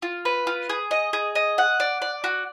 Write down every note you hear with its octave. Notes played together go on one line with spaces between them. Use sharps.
F4
B4
F4
G#4
D#5
G#4
D#5
F#5
D5
D5
F#4